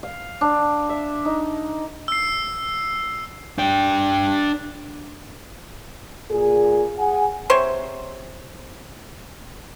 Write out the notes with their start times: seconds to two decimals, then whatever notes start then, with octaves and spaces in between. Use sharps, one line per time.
0.03 F5
0.41 D4
0.89 E5
1.25 D#4
2.08 E6 C7
3.59 D4 G5
6.30 A#2 G#4
6.98 G#4 F#5 G#5
7.50 C3 C5 C#5